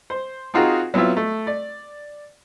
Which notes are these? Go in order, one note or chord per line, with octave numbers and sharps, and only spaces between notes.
C5
C4 D#4 F4 F#4 G#4 A#4
F#3 B3 C4 E4 F4 E5
A3
D5